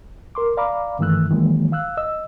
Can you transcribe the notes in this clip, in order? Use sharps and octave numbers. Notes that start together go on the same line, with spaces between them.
A#4 C6 D6
D5 F5 A#5 B5 D6
G2 D#3 E3 A3 E6 F#6
D#3 E3 F#3 G#3 A#3
F5 E6 F#6
D#5 E6